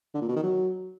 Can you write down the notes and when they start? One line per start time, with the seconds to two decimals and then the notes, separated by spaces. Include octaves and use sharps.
0.14 D3
0.21 A#2
0.29 B2
0.36 D#3
0.43 F#3